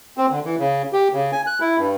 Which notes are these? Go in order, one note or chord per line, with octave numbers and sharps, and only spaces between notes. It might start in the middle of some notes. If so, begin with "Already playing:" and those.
C4
D3
E3
C#3
G4
C#3
G#5
F#6
E4
G2